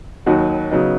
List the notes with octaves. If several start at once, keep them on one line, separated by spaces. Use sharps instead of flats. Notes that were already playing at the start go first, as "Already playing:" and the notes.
D#2 D#3 F#3 D#4 F#4
C#3 F#3 B3 D#4